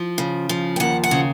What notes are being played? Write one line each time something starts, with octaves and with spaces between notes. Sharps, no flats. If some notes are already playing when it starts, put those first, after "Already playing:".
Already playing: F3
C#3
F3
G5
D#2 F#5
F#5
C#3